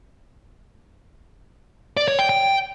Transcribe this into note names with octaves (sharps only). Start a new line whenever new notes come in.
D5
C#5
G5
G5